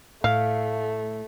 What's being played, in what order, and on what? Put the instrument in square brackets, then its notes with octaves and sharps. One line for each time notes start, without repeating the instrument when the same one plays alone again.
[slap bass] A2 [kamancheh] A3 [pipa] F5